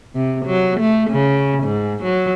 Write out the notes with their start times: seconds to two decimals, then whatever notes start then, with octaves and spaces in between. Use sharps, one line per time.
0.15 C3
0.46 F#3
0.80 A3
1.11 C#3
1.64 G#2
2.04 F#3